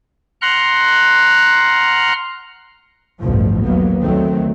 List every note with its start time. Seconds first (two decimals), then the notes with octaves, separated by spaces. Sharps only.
0.42 F#5 A#5 C6 F6 F#6
3.20 A1 D2 G2 B2 F3
3.63 D#2 A2 F#3 A#3 B3
4.01 D2 D#3 F#3 A3 C4